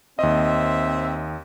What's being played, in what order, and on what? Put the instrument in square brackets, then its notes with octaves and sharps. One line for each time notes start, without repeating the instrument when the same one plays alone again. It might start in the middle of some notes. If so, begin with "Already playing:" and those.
[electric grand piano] D#2 D#5 [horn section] C4 E5